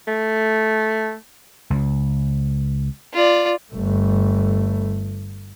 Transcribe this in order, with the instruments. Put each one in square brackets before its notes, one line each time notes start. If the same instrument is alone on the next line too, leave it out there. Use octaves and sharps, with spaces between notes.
[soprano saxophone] A3
[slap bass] C#2
[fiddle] F4 D5
[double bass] G1 A3